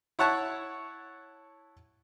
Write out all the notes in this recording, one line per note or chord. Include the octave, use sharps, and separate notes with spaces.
E4 C#5 F#5 A5 C#6